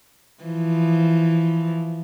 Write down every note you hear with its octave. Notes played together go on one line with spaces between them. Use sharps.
E3 F3